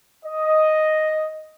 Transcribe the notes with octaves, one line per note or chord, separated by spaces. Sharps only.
D#5